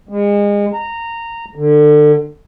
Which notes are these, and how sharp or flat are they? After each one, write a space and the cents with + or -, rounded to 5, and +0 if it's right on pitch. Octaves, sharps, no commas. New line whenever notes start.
G#3 -30
A#5 -15
D3 +25